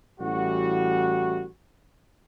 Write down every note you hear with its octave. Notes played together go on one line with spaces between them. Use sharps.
A1 E3 G3 F#4